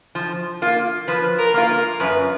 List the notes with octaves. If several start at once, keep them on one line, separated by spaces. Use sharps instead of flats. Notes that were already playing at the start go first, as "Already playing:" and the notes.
F3
A#3 F4
F3 B4
A#4
A#3 F4
A#4
F#2 B4